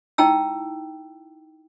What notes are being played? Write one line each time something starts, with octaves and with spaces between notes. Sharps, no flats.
D#4 E4 G5 A5 E6